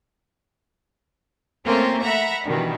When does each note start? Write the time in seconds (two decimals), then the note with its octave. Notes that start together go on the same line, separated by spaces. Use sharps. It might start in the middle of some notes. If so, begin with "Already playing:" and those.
1.65 A3 A#3 C4 C#4 F4 A#4
2.02 E5 F#5 A#5 B5
2.46 G2 B2 D#3 E3